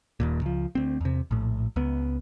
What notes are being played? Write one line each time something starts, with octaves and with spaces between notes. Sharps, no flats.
D#1 D#2 A#2
C#2 F3
D2 C4
E2 C3
A#1 A2
C#2 B3